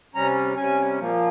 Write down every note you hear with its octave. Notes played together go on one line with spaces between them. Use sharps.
C3 G3 C#4 A#5
C3 G3 C#4 G#5
A#2 F3 A#3